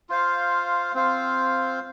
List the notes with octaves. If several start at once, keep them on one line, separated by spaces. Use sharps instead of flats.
F4 C5 F5
C4 F4 C5 F5